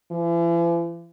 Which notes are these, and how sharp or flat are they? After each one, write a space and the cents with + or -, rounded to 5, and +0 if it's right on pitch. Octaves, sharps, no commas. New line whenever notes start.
E3 +45